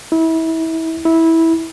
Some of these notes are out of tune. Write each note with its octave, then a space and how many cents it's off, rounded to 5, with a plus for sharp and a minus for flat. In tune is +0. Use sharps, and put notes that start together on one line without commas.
E4 -30
E4 -15